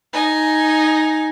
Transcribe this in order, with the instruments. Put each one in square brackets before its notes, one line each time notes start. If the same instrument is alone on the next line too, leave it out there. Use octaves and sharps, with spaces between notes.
[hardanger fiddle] D#4 G#5